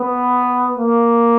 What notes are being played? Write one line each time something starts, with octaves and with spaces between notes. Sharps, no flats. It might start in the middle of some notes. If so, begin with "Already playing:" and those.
Already playing: B3
A#3